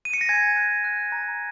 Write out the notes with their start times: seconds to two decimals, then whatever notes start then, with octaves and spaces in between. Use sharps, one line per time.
0.05 D#7
0.14 C#7
0.21 A#6
0.29 G#5 G#6
0.56 F#6
0.84 F#6
1.12 A#5